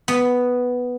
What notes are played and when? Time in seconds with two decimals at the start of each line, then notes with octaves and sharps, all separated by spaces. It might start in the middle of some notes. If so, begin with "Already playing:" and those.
0.08 B3